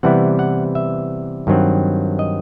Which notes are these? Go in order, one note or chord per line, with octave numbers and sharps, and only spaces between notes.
C3 E3 G3 B3 E4 F#5
F#5
E5
G2 D#3 F#3 C4
D#5